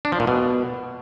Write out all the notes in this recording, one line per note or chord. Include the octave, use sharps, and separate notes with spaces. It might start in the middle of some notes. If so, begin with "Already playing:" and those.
D4
F3
A#2
B2